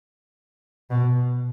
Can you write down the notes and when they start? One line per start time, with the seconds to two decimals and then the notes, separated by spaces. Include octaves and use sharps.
0.90 B2